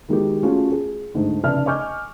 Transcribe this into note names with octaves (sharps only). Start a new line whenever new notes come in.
D#3 G#3 F#4 G4
A3 C#4 F4 F#4 G#4
G#4
D2 G#2 A3
F1 C#3 D5 E5 A5 F6
D#5 G#5 C#6 D6 F6 G6